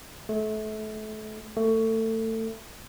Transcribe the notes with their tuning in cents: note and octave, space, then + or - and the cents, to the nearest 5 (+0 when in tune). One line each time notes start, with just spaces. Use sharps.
A3 -30
A3 +25